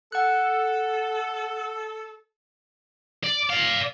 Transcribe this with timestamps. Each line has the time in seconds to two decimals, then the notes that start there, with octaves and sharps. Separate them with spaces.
0.12 A4 F#5 F#6
3.24 D5
3.49 D5 F5